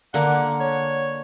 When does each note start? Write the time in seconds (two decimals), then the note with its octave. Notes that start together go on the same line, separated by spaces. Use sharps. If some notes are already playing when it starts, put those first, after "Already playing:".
0.14 D3 A#3 F#5
0.60 C#5